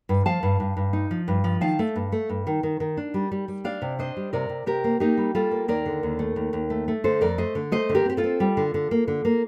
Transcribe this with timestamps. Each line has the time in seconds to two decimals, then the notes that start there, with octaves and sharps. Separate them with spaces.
0.09 G2
0.26 F3 F5 A5
0.43 G2
0.60 G2
0.77 G2
0.93 D#4
1.11 F3
1.28 G2
1.44 F3
1.61 D#3 F5 A5
1.79 A3
1.96 G2
2.12 A3
2.29 G2
2.47 D#3
2.63 D#3
2.80 D#3
2.97 D4
3.14 G3
3.32 G3
3.48 G3
3.64 D4 D5 F5
3.82 C3
3.99 D4 C5 D#5
4.17 G3
4.33 C3 A#4 D5
4.49 C3
4.66 C3 G4 A#4
4.84 A#3
5.00 A#3 D#4 G4
5.17 G3
5.35 G3 F4 A4
5.51 A#3
5.68 D#2 A#4 D5
5.86 D3
6.03 D#2
6.19 A3
6.36 D#2
6.53 D#2
6.70 A3
6.88 A3
7.04 D3 A4 C5
7.21 F2 A#4 D5
7.38 A3 C5 D#5
7.55 D3
7.72 A3 C5 D#5
7.89 D3
7.95 G4 A#4
8.05 C4 G4
8.17 F4 A4
8.24 C4
8.40 G3
8.57 D3
8.74 D3
8.91 A#3
9.08 D3
9.25 A#3